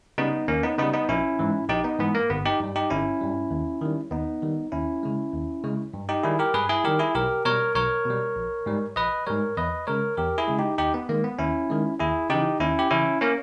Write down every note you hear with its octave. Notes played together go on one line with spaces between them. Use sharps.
C#3 G3 B3 D#4
D#2 A#3 C#4
B3 D#4
C#3 G3 B3 D#4
B3 D#4
A#1 C#4 E4
G#2 E3
A#1 D#4 G4
B3 D#4
G#2 E3 B3
A#3
G1 B3
D#4 G4
G2 G3
D#4 G4
G1 C#4 E4
G2 G3
D#2
D#3 G3
D#2 B3 D#4
D#3 G3
D#2 C#4 E4
C#3 G#3
D#2
C#3 G#3
G2
D#4 G4
D#3 G3 E4 G#4
G4 A#4
G2 G#4 B4
E4 G#4
D#3 G3 G4 A#4
E4 G#4
B1 G4 A#4
B2 G3 A#4 C#5
B1 A#4 C#5
B2 G3
A#1
G#2 G3
A#1 B4 D#5
G#2 G3 A#4 C#5
E2 B4 D#5
C#3 G#3 A#4 C#5
E2 G4 A#4
E4 G#4
C#3 G#3
D#4 G4
D#2 D#4 G4
B3
D#3 G#3 A#3
B3
D#2 C#4 E4
D#3 G#3
D#2 E4 G#4
C#3 E3 D#4 G4
D#2 C#4 E4
G4
C#3 E3 C#4 E4
A#3 C#4